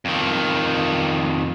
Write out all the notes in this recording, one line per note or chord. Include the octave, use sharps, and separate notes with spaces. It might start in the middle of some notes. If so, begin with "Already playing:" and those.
F2 D#3